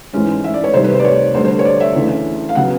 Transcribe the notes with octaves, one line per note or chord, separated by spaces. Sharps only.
G#2 E3 G#3 C#4
E5
D5
C#5
C3 D#3 G3 C5
B4
C5
D5
C#5
D2 D3 G3 C5
C5
C#5
D5
E5
D2 C#3 E3
F5
C#3 F#3 B3 F#5